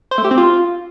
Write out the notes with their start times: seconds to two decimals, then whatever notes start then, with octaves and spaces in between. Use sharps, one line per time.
0.11 C5
0.18 A3
0.24 G4
0.31 C4
0.38 F4